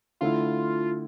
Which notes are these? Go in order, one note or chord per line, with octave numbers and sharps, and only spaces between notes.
D3 A3 E4 F4